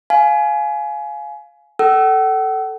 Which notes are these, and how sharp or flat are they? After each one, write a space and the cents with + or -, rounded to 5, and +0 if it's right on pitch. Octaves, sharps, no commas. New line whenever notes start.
F5 +0 G#5 +25
A4 +5 F#5 +45 E6 +0